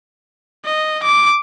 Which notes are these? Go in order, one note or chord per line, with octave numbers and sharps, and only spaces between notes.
D#5
D6